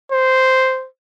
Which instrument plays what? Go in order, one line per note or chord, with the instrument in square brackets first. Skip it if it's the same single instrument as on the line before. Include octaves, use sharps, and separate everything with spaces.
[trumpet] C5